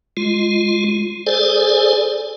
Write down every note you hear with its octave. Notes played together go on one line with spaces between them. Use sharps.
G#3 F4
G#4 A4 C5 D5 G#5